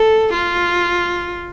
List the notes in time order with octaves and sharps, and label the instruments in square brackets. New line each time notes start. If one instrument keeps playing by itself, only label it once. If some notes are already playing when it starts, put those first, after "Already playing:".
Already playing: [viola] A4
F4